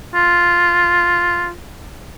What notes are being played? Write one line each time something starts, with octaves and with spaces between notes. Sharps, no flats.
F4